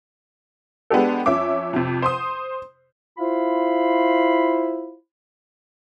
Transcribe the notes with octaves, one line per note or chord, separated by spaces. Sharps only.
G#3 B3 D4 G4 A4
F2 C#4 E5 D6
F2 C3
C5 C6 D#6
E4 F4 C5 F5 B5